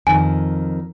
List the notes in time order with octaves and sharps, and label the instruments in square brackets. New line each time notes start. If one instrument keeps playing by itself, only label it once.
[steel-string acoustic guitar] F2 D#3 [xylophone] G#5